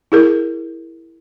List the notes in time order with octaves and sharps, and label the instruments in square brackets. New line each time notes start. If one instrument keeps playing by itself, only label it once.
[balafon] E4 G#4 A#4